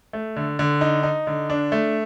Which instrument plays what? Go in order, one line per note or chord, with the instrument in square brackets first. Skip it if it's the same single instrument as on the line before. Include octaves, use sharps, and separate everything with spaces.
[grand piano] A3
D3
D3
D#4
D#4
D3
D4
A3